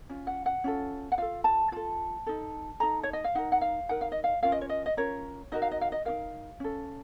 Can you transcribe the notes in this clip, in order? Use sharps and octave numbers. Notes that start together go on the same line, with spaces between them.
C#4 F4
F#5
F#5
C#4 F4 A4
F#5
F4 A4 F5
A5
F4 A4 A5
D#4 A4
D#4 A4 A#5
C#5
D#5
F5
D#4 A#4 F#5
F#5
F5
D#4 A#4 F#5
F5
D#5
F5
C#4 F4 A#4 F5
D#5
C#5
D#5
D#5
C#4 F4 A#4 C#5
D#4 F#4 A#4 D#5
F5
D#5
F5
D#5
D#4 F#4 A#4 F5
C#4 A4